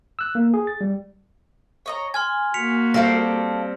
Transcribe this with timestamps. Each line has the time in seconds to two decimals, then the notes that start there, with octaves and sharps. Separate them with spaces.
0.19 E6 F#6
0.35 A#3
0.54 G#4
0.67 A6
0.81 G3
1.86 C#5 D#5 A#5
2.14 G#5 C6 F6 G#6
2.54 A#3 F#4 B6 C#7 F7
2.94 G3 C4 A4 F5 G6 A#6 D7